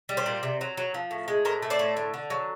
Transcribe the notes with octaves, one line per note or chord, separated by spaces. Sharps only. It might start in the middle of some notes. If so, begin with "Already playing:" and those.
G3
C5 D5
A#2
C3
F#3
F#3
F3
A2
G#3
A2 A#4 C5
A3
C5 D5
A2
D3
D3
F#3